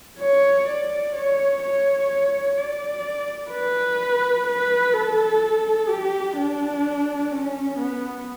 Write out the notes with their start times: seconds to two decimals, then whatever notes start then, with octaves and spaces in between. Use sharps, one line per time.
0.20 C#5
0.67 D5
1.14 C#5
1.62 C#5
2.10 C#5
2.57 D5
3.51 B4
4.47 B4
4.94 A4
5.89 G4
6.36 D4
7.31 C#4
7.79 B3